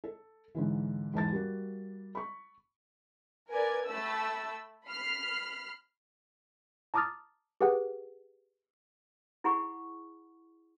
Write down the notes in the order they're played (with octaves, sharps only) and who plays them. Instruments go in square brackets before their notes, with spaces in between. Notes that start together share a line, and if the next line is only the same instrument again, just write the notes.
[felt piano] A4
G#2 D3 E3
E2 G#2 A5 A6
G3 A#3 F#4
B5 C#6
[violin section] A#4 B4 D5 G#5 G#6
A3 G5 A5 B5 E6
B5 F6 C7
[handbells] A5 A#5 D6 D#6 F6 A6
G4 G#4 B4 F#5 G5
[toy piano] E4 G#4 F#5 B5 C#6